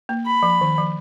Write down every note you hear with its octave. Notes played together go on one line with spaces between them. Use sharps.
A#3
B5
F3
D#3
F3